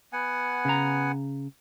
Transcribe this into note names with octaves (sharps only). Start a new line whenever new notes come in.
B3 F#5 G#5
C#3 A#5